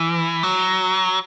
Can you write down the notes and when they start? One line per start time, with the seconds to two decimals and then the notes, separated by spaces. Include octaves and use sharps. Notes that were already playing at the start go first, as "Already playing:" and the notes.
Already playing: E3
0.43 F#3